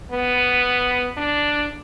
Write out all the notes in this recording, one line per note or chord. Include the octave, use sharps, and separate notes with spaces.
B3
D4